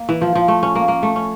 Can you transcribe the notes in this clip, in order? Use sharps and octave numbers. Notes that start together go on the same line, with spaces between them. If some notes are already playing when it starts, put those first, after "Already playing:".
Already playing: A#3
E3
F3
F3
A3
C#4
A#3
A#3
A3
C#4